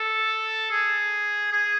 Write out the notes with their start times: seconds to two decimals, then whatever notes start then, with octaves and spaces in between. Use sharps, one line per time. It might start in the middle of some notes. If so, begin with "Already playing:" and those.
Already playing: A4
0.71 G#4
1.52 G#4